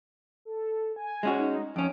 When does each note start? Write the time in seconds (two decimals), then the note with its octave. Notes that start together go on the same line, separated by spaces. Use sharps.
0.45 A4
0.96 G#5
1.23 G#3 C#4 F#4
1.39 D#4
1.76 F2 C#4 D7